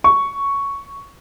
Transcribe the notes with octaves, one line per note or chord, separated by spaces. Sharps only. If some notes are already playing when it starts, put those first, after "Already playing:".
C#6